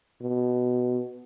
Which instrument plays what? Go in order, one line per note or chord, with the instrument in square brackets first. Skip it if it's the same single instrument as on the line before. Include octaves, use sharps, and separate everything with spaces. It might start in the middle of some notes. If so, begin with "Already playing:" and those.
[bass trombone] B2